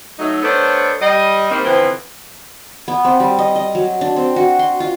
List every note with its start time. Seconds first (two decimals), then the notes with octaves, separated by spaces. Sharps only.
0.19 F#3 A3 D#4
0.43 A3 B3 D4 A4 C5 C#5
1.01 G3 D#5
1.50 D#3 G3 A#3 C4
1.65 D3 E3 F3 B3 C4
2.88 B3
3.05 C4
3.20 G3
3.39 D#5
3.56 D#5
3.75 F#3
4.01 D4
4.16 C4
4.36 F#4
4.59 C6
4.80 F4